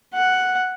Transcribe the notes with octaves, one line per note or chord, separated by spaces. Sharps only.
F#5